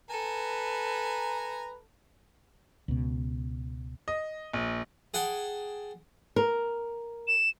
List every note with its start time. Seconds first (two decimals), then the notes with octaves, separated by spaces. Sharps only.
0.10 A4 B4 G#5 A#5
2.88 C#2 B2
4.08 D#5
4.53 A#1
5.14 G#4 F#5 G5 A5
6.36 A#4
7.28 E7